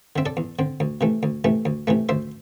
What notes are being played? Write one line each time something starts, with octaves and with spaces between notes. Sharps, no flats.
D3 C4 E5
A4 D5
E2
D3 C4
D2
C3 E3 A3
D2
C3 E3 A3
D2
C3 E3 A3
D2 C5 E5